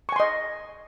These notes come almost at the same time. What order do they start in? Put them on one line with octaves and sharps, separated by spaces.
C#6 G#5 C6 D#5